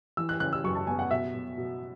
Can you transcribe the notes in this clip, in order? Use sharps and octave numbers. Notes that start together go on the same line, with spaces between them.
E3 E6
F#6
C#3 F#6
E6
F#2 C#6
A5
B3 G#5
F#5
B2 E5
B2
B2